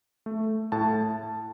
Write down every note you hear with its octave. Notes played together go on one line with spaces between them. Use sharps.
A3
A2 A5